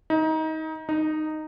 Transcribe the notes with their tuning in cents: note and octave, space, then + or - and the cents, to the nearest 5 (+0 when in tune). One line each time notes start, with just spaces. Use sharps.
D#4 +25
D#4 -10